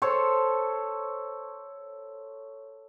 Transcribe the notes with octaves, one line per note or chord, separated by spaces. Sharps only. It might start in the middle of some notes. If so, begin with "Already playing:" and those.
A4 C5 C#5 A5